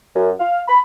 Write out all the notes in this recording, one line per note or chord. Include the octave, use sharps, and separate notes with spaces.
F#2
F5
B5